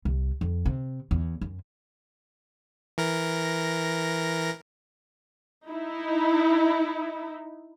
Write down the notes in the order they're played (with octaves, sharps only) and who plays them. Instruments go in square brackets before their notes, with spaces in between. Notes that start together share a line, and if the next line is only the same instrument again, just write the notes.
[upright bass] C2
F2
C3
E2
F#2
[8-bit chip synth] E3 A#4 A#6
[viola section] D#4 E4